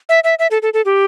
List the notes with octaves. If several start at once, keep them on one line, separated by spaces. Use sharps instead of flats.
E5
E5
E5
A4
A4
A4
G4